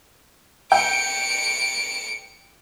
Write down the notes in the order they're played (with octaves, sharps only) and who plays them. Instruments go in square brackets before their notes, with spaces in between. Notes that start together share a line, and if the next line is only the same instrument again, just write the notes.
[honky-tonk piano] G5 [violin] C#7 D7